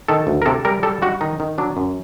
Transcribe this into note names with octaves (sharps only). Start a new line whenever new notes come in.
D#3 A4
D2
A#4
C3 A4
G3 A#4
G3 A4
G3 F#4
D#3 D#4
D#3
F#3 D4
F#2